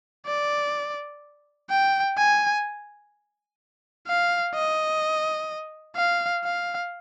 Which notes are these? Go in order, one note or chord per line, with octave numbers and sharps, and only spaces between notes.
D5
G5
G#5
F5
D#5
F5
F5